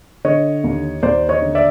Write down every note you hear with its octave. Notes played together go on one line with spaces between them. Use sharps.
D3 C#5 D#5
D#2
D#2 C5 D5
C#5 D#5
D3
D5 E5